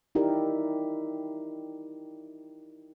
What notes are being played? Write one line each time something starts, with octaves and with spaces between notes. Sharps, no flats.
D#4 E4 G4 A#4 D5